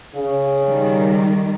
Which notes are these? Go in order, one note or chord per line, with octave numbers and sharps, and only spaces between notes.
C#3
D#3 G3